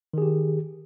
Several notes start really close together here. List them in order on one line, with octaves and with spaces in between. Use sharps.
D#3 G#4 G4